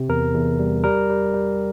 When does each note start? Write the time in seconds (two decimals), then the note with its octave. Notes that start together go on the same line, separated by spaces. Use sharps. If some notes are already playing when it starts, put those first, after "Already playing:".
Already playing: C3
0.09 E2 A#4
0.34 E2
0.59 G3
0.84 G3 A#4
1.10 G3
1.34 G3